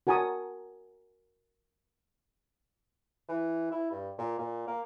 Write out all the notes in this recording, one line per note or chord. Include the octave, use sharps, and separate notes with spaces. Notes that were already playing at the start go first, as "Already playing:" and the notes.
F#4 A#4 G#5 A5 C#6 D#6
E3
E4
G2
A#2
A#2
A#3